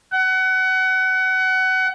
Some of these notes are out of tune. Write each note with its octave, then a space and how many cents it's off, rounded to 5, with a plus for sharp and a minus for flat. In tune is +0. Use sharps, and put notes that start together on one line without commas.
F#5 +25